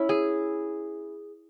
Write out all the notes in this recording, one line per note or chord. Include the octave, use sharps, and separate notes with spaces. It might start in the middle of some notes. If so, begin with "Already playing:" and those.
Already playing: C#4 E4
G#4